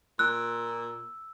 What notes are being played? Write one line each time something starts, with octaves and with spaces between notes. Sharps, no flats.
A#2 E6 F#6